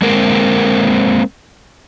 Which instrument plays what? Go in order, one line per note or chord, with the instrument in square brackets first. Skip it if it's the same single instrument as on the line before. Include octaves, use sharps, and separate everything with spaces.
[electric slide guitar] G#3 A#3 C4 A#4